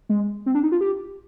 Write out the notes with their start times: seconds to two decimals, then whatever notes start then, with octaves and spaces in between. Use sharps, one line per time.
0.09 G#3
0.46 C4
0.55 D4
0.63 D#4
0.72 F4
0.81 G4